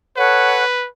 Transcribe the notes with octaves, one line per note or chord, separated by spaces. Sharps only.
A4 B4 C#5 F#5